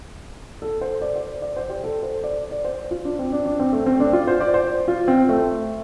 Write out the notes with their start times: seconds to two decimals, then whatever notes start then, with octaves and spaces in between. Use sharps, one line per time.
0.62 A4
0.81 C5
1.02 D5
1.16 C5
1.42 D5
1.57 C5
1.69 G4
1.84 A4
2.03 C5
2.24 D5
2.51 D5
2.65 C5
2.91 F4
3.05 D4
3.19 C4
3.32 D4
3.46 D4
3.59 C4
3.73 A3
3.86 C4
4.00 D4
4.13 F4
4.27 C5
4.41 D5
4.54 C5
4.88 F4
5.08 C4
5.29 A3